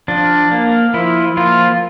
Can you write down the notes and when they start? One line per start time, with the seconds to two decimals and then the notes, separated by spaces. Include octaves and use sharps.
0.08 F3 D4
0.51 A#3
0.94 F3 E4
1.37 F3 A#3 F4